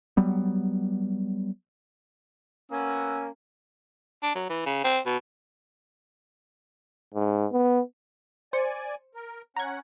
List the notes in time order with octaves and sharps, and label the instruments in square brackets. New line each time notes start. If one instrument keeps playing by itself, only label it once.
[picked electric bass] F#3 G3 B3
[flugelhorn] A#3 [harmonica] B3 F#4 E6 [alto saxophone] C#4
[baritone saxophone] D4
F#3
E3
C#3
C4
B2
[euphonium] G#2
B3
[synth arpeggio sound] C5 C#7 [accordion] D5 G#5
[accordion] A#4
[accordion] C#4 F#5 [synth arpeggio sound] A#5 G#6